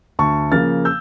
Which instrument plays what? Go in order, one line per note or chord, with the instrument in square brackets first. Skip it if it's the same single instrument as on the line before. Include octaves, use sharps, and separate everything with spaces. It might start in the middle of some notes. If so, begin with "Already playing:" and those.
[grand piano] D2 A5 C#6
C#3 F3 A#3 F6 A6
E6 G6